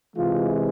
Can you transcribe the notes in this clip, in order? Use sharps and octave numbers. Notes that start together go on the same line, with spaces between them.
C3 E3 G#3 F4